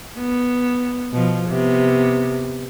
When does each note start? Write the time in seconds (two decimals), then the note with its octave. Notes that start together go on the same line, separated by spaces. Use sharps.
0.17 B3
1.12 B2 F3
1.49 C3 B3